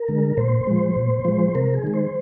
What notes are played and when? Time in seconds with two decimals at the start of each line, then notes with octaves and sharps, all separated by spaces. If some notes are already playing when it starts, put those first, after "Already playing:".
Already playing: A#4
0.08 D3 G#3
0.37 A#2 C5
0.67 F3 G#3
0.96 A#2
1.25 F3 G#3
1.55 C3 A#4
1.74 G#4
1.84 D#3 G#3
1.94 C5